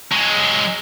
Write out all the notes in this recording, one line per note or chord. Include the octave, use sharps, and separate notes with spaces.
F#3 G#3